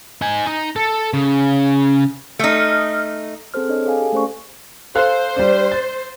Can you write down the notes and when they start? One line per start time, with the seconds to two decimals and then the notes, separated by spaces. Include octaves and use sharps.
0.22 D#4 G#5
0.46 D#4
0.76 A4
1.14 C#3
2.39 A3 D#4 D#6 F6
3.54 C4 G#4 A4 C5 F6
3.69 D4 A4 C#5 D#5
3.85 G#4 A4 F5 G#5
3.99 G4
4.13 A3 C#4 C5 D5 C#6
4.95 A4 C5 F5 F#6
5.36 G3 D4
5.72 A6